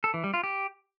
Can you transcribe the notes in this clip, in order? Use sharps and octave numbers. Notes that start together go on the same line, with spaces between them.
A4
E3
G3
F4
G4